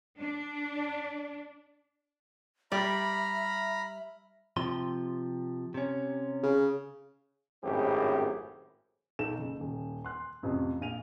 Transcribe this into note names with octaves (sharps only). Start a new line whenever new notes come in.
D4
G3 D5 E5 A#5 B5 F6
C3 F3 C6
C3 C#4
C#3
G#1 F#2 A2 C4 G4 G#4
B1 D#4 A4 E7
F#1
D#1
C6 F#6
A1 F2 C3
A#1 F5 D#7 F7